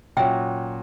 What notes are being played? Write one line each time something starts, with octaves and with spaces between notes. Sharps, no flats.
A#2 F#3 C#4 F#4 E5 G5